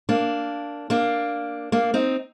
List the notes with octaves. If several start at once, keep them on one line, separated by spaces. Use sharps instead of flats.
A#3 D4
A#3 D4
A#3 D4
C4 D#4